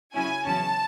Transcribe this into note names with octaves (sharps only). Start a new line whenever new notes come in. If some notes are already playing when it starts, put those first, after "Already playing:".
C#3 F#3 C#4 E4 G#5
E2 C#3 F#3 C#4 E4 A5